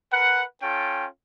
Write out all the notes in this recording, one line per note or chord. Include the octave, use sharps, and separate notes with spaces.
A#4 B4 F#5
C#4 F4 A4 G5